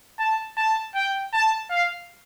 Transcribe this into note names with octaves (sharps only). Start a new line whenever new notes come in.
A5
A5
G5
A5
F5